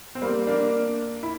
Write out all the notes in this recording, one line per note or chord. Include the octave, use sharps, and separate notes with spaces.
C4
G3 A#3
A#3 D4
E4